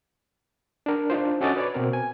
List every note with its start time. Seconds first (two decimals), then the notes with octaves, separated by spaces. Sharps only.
0.86 D4 A#4
1.10 D4 D#4 F4 C5
1.41 C#4 F#4 A4 D#5 D6 A6
1.56 B4 C#5 D5
1.74 B2 C4 A#4
1.93 G#5